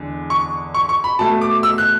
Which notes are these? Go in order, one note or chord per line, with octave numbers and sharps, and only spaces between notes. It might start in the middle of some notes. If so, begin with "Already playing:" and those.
Already playing: E2 D3 G#3
C#6
C#6
C#6
B5
B2 A3 A5
D6
E6
F#6